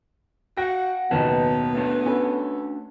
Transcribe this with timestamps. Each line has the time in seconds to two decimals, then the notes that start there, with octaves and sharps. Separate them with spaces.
0.57 F#4 F#5 G5 A#6
1.11 F#1 D#2 B2 B3 B4 C#5 A5
1.75 A3 D4 C#5
2.06 C#4 A4 B4